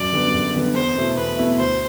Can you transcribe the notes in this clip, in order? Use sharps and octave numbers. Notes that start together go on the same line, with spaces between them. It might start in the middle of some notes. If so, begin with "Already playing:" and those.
Already playing: F#2 D5
D3 G3 B3
F#2
D3 G3 B3
E2 C5
B2 A3 E4
E2 B4
B2 A3 E4
D2 C5